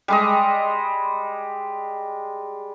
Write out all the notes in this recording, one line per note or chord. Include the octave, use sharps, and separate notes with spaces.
G3 G#3 D#5